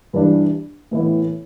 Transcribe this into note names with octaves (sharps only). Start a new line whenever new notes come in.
G2 E3 G3 D4
A2 E3 B3 E4